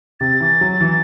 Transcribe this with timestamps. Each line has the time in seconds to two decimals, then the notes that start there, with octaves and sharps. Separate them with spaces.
0.20 C3 A6
0.40 E3
0.61 F#3
0.81 E3